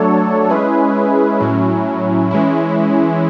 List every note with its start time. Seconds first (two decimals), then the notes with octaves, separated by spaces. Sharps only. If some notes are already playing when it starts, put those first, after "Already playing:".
Already playing: F#3 A3 D4 A4 C#5
0.50 G#3 C#4 E4 G#4 B4
1.40 A2 F#3 C#4 E4
2.31 E3 G#3 C#4 E4